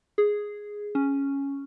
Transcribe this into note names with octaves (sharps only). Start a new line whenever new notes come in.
G#4
C#4